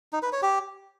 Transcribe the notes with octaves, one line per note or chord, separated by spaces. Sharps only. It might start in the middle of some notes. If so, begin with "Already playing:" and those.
D#4
B4
C#5
G4